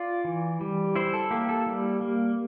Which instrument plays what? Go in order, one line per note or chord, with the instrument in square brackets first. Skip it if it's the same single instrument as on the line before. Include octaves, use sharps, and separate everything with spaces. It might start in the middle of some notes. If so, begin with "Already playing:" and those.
Already playing: [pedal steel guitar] F4 D5
E3
G3
E4 C5
A4
A#3 G4
A4
G3
A#3